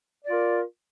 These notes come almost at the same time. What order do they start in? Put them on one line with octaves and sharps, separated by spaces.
D5 F4 A#4